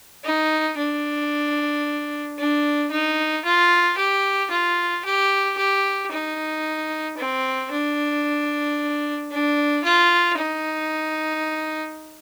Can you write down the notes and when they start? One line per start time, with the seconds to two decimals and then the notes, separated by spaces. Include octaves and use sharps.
0.25 D#4
0.78 D4
2.38 D4
2.91 D#4
3.45 F4
3.97 G4
4.51 F4
5.05 G4
5.57 G4
6.11 D#4
7.17 C4
7.71 D4
9.32 D4
9.84 F4
10.38 D#4